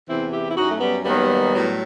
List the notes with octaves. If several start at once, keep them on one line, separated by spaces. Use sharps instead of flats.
E2 C3 E3 C4 E4
E4 G4
E4
F#2 F#3 D#4 F#4
A3
G3 B3
D#2 D#3 F#3 G3 B3
A2 F#3